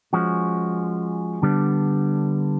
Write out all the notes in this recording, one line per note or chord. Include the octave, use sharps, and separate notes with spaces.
F3 G#3 C#4 F#4
D3 G3 B3 D4